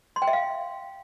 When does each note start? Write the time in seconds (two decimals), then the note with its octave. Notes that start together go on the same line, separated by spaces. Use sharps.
0.16 C6
0.22 G5
0.27 E5
0.33 F5